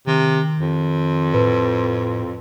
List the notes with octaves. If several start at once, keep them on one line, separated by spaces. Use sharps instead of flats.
C3 D#3
F2
A2 B4